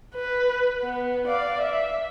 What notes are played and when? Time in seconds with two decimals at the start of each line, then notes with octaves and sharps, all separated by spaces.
0.15 B4
0.83 B3
1.28 D5 F5
1.61 E5